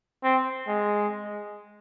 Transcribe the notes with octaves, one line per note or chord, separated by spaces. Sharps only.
C4
G#3